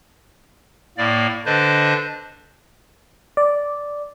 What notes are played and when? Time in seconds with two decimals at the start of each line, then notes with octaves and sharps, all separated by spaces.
0.98 A2 A#3 D5
1.46 D3 D4 B4 C5 D#5
3.37 D5